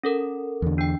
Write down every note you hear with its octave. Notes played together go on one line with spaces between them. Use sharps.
C#4 A4 A#4
E2 D3
D4 G5